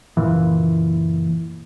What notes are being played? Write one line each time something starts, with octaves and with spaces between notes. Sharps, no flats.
F#1 A#2 E3